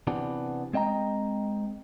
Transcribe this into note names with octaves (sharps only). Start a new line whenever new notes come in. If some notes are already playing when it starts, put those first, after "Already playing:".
C3 E3 B3 D4
G#3 C4 D#5 G5 A#5